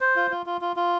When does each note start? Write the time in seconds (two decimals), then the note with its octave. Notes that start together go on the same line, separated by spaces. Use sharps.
0.01 C5
0.16 F4
0.31 F4
0.46 F4
0.61 F4
0.76 F4